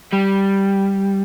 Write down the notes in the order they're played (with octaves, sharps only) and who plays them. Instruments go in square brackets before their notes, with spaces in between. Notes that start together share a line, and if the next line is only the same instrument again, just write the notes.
[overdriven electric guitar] G3